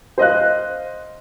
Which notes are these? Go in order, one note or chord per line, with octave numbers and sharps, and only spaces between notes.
C5 D#5 F5 F#6